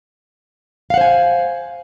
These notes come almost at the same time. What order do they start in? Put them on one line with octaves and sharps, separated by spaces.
F5 F#5 C5 G#5